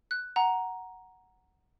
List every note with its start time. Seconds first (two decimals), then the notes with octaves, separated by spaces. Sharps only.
0.11 F#6
0.36 F#5 A#5